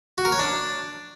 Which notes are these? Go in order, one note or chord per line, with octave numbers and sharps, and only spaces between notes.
F#4
A#4
C#5
D4